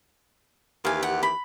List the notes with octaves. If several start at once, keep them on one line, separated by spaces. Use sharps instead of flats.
D#2 E3 G4 F5 G#5
F#5
B5